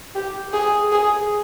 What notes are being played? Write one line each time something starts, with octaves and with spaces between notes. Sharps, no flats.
G4
G#4
G#4